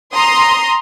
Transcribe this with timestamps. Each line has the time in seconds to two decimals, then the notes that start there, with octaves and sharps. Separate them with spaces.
0.15 A#5 C6 D#6